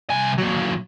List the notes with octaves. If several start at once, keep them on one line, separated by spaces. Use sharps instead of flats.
C2 G#5
A#2 F#3